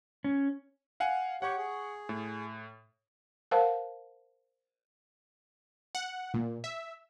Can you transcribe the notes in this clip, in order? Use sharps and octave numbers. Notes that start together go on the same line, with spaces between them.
C#4
F5 F#5 G#5
G4 C#5 F#5 C#6
G#4
A2
A#4 C5 F5 F#5 A5
F#5
A#2
E5